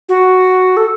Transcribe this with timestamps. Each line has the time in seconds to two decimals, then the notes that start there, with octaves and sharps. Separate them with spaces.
0.09 F#4
0.77 A4